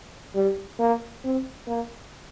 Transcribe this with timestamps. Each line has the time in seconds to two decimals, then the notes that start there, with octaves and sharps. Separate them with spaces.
0.35 G3
0.79 A#3
1.24 C4
1.67 A#3